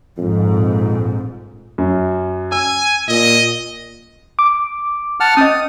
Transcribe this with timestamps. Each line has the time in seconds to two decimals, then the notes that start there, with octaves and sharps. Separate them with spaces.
0.18 A#1 F2 G#2
1.78 F#2
2.52 G#5 E6
3.08 A#2 D#5
4.39 D6
5.20 F#5 A5 F6
5.37 C#4 D#5 D#6